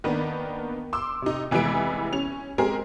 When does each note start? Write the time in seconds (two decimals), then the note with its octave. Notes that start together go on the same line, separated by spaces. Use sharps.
0.04 D#3 A#3 B3 D4
0.93 C6 D6 E6
1.22 C3 D#4
1.51 F1 E3 G#3 B3 E4 D7
2.13 C#4 F7
2.58 G#3 C4 G4 G#4 A#4